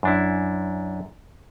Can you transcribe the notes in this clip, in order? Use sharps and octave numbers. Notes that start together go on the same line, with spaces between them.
F#2 D4 E4